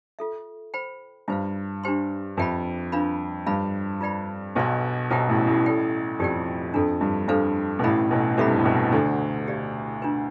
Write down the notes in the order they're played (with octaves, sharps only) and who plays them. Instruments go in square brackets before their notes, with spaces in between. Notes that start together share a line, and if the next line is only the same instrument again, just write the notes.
[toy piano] F4 A4 E5
C5 G5 B5
[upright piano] G2 [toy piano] F4 C5 F5
[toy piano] D4 G4 C5 G5 C6
[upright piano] F2 [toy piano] B4 E5 G5 B5
[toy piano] D4 F4 B4 F5 B5
[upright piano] G2 [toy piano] B4 F5 B5
[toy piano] F4 B4 D5 G5 B5
[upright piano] B1 B2 [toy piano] C5 F5 C6
[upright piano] B1 B2 [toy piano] F4 C5 E5 G5 C6
[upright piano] A1 A2
A1 A2
[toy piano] A4 D5 G5 B5
[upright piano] F2 [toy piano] G4 D5 G5
[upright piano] F2 [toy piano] D4 F4 A4
[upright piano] G2
[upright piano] G2 [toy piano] D4 A4 C5 F5
[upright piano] B2
[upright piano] A1 A2 [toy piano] B4 F5 B5
[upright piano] B1 B2
[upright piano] C2 C3 [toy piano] A4 E5 B5
[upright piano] G2
A2
B1 B2
[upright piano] D2 D3 [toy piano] D4 A4 D5
[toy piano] G4 D5 F5
D4 F4 B4